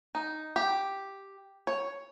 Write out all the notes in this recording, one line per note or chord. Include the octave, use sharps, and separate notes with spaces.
D#4
G4
C#5